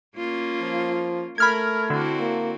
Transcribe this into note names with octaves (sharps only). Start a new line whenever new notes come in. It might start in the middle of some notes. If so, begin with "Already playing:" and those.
A#3 C#4 F4
F3
A3 A#4 B5 F6 G#6
D3 C4 E4 F#4
A#3